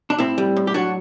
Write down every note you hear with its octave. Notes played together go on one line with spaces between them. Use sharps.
D4
A2 C4 E4
G3
A2
G4
F#3 D4 F#4